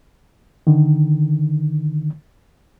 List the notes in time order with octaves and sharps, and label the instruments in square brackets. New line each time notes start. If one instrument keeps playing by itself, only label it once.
[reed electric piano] D3 D#3